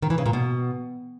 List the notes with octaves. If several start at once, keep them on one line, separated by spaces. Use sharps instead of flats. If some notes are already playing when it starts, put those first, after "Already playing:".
D#3
E3
C#3
A#2
B2